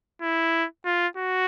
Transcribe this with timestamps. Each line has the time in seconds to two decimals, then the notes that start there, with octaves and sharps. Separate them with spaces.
0.22 E4
0.85 F4
1.17 F#4